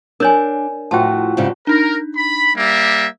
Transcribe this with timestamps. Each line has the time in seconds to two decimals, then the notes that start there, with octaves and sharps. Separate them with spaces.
0.20 D4 A#4 C#5 G#5
0.91 A2 F3 F#4 G5 A5
1.37 G#2 C#3 G3
1.67 D4 D#4 A#4
2.16 B5
2.56 G3 A#3 E5